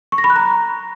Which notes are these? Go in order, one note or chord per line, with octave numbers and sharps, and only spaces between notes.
C#6
A#6
B5
F#6
A#5